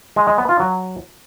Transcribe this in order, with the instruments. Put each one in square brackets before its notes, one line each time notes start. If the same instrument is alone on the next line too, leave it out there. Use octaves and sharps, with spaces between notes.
[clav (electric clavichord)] G#3
G#3
B3
F4
F#3